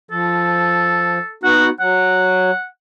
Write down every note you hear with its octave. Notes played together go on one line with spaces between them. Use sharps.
F3 A4
B3 D#4 F#4 F#5
F#3 F#5